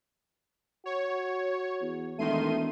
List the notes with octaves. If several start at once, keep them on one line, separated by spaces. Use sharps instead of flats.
F#4 C#5
E2
E1 D#3 A3 E5 C6 D#7